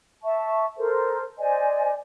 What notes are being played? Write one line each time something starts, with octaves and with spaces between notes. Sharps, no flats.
E5 A5 C#6
A4 A#4 C5
C5 D5 D#5 G#5